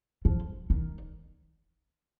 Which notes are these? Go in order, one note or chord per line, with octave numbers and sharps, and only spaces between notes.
F3
D#3